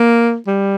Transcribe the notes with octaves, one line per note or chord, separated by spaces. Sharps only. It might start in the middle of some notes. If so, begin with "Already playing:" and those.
Already playing: A#3
G3